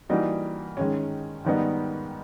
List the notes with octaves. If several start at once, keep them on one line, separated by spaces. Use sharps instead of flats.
E3 G3 A#3 D#4 F#4
D#3 G#3 C#4
G#2 D#3 G3 B3 D#4